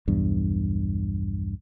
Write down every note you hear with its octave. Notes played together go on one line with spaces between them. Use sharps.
B1 E2 G2